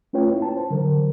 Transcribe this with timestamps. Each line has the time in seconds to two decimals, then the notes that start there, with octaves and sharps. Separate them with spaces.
0.13 A3 C#4 F4 B4 C#5 G5
0.30 A#3 E4
0.42 A5
0.57 C5
0.70 D3 E3 F#3 A#4